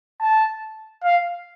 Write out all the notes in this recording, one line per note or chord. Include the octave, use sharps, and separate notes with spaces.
A5
F5